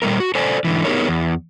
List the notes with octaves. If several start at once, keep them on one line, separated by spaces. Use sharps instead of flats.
A#2 G3 A3 A#4
F#4
A4 C5 D5 G#5
G#2 D3 E3
B3 D#4 G4 G#4 A#4 C#5
E2